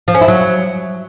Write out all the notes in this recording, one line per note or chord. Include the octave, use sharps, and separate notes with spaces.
F3
C#4
E4
F#3